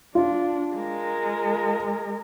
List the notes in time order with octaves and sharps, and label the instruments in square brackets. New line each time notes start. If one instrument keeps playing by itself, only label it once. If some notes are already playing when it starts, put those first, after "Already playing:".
[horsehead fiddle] D4 [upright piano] F4
[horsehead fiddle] G#3 A#4